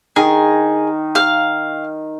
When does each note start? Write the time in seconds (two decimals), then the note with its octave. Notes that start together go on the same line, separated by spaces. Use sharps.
0.16 D#3 G#4
1.15 F5 F6